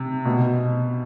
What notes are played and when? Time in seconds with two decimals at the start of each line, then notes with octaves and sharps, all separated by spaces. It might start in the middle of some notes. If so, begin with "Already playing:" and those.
Already playing: C3
0.25 B2